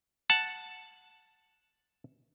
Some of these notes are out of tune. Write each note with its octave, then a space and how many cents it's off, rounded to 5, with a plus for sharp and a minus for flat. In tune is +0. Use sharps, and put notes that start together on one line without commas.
F#5 -5 A5 +0